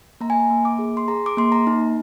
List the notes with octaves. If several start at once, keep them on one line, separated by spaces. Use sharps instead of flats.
A#3 A#5
G#5
A#5
A#3
D6
G#4
C6
G#4 A#5
D6
A#3 C6
A#5
D#4